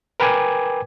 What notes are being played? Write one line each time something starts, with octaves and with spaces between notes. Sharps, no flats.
A#4 B4 G5 G#5 D6 G#6